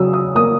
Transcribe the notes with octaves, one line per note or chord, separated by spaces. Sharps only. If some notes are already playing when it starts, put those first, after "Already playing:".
Already playing: C#3 F#3 D#6 E6
D#6
A#3 D#6